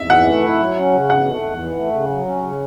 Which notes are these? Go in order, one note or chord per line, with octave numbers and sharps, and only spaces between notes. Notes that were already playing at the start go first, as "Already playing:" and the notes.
Already playing: E2 E5
E3 F#5
A3
E4
F#3
C#4
C#3
B2 F#5
A3
E2
E3
A3
C#3
F#3
C#4
C#3